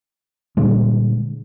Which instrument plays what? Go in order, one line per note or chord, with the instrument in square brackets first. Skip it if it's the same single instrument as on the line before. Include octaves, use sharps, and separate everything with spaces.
[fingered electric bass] A#2 D3 G3 G#3